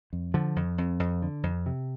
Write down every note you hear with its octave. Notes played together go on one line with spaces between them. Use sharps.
F2
D3 F3
F2
F2
F2
D3
F2
C3